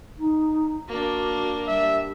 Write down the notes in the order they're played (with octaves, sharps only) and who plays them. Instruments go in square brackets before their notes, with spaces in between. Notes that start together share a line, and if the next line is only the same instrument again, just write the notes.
[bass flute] D#4
[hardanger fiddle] A#3 D4 [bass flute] F#4
[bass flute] G3 [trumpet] E5